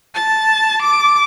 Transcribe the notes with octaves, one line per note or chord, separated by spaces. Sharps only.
A5
D6